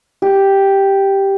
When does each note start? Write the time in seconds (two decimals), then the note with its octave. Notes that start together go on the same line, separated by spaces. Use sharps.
0.22 G4